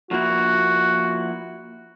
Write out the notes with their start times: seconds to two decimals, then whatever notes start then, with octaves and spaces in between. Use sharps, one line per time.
0.11 F3 A#3 E4 F#4